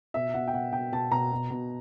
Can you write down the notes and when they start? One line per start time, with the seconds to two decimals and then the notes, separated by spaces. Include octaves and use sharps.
0.14 B2 E5
0.34 B2 F#5
0.47 G5
0.53 B2 F#5
0.72 B2 G5
0.92 B2 A5
1.12 B2 A#5
1.32 B2
1.50 B2